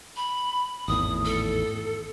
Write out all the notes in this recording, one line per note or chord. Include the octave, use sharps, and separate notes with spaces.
B5
G#1 E2 A2 D#6
A4